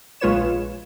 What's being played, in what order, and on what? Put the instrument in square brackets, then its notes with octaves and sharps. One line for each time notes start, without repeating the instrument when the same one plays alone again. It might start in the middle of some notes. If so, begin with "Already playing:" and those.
[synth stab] A#1 G#3 F4 B4 C#5 E7